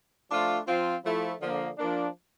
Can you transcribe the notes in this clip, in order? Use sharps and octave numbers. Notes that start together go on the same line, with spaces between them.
F3 A3 D4 F4
F3 C4 F4
F3 A3 E4
D3 F3 A#3
F3 A#3 D4